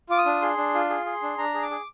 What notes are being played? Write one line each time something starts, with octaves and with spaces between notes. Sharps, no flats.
F4 D6
D#6
D4
G#4 C6
D4
F4
G#4
G#4
D4
D4 A#5
G#4
D6
G#4